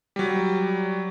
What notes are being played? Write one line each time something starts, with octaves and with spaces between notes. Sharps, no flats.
F#3 G3